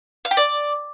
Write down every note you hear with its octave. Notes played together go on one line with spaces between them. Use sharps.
F5
G4
D5